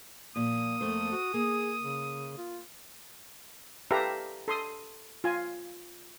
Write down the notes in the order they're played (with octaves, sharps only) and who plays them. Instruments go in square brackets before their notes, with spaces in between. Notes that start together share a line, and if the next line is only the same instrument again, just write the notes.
[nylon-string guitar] A#2 F3 [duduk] A#3 [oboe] D#6
[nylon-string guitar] F2 A3 C5
[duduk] F#4
[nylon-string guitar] A#3 [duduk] G#4
[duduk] C#3
F4
[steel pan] G4 A4 B4 E5 F5 A#5
A4 C6 D#6
F4 G#5